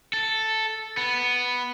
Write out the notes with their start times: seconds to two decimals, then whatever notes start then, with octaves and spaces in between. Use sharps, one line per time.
0.13 A4
0.97 B3